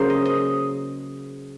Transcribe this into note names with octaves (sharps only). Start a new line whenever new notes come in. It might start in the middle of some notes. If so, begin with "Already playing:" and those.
Already playing: C#3 F#3 A#3 G#4 A#4 C5
D#5
D#5